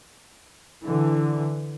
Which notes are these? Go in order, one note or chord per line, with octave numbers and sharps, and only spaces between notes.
D3 E3